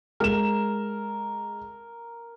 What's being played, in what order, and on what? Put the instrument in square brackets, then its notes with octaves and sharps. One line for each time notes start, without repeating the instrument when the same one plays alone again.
[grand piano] G#3 E7 [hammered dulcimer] A#4